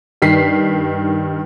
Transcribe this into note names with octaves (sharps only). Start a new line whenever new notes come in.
G2 D#3 B6 C7